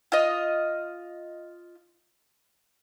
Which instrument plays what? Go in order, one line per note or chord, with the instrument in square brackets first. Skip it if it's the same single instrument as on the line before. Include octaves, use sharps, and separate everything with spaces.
[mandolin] F4 D#5